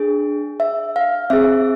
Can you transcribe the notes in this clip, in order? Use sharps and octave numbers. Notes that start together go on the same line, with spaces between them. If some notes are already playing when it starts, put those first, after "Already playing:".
Already playing: D4 G#4
E5
F5
C4 G#4 E5